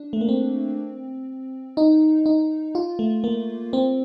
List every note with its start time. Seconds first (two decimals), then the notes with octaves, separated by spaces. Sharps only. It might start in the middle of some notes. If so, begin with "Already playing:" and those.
Already playing: D4
0.13 A3
0.21 A#3
0.29 C4
1.77 D#4
2.26 D#4
2.75 F4
2.99 A3
3.24 A#3
3.73 C4